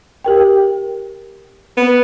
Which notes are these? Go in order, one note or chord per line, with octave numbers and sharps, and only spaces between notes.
G4 A#4 G5
B3